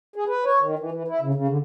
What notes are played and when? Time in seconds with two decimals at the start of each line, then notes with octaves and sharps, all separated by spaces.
0.16 G#4
0.28 B4
0.45 C#5
0.61 D#3
0.79 E3
0.92 E3
1.08 E4
1.21 C#3
1.35 C#3
1.48 D3